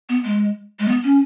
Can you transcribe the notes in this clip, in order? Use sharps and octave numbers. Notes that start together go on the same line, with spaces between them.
B3
G#3
G#3
B3
C#4